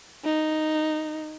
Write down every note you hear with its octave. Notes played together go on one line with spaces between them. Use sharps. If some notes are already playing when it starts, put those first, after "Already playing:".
D#4